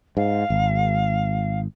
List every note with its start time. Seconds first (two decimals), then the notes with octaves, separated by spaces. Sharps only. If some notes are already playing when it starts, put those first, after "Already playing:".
0.17 G#2 F5
0.50 G#1